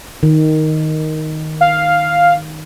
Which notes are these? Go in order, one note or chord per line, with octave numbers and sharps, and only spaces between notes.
D#3
F5